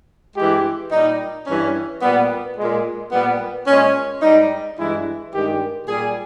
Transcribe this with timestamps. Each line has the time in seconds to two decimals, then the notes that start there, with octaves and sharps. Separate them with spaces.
0.36 G2 E3 G#3 G4
0.92 A#2 G3 D#4
1.47 G2 E3 G3 C#4
2.01 A#2 G3 B3
2.57 A#2 G#3
3.12 A#2 G3 B3
3.67 A#2 G#3 C#4
4.22 G#2 G3 D#4
4.77 G2 E3 G#3 E4
5.32 G2 D#3 G#3 G4
5.88 A#2 G3 G#4